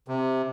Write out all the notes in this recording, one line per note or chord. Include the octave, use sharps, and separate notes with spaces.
C3